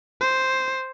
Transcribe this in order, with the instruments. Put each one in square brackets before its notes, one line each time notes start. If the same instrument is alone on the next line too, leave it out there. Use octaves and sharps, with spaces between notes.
[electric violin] C5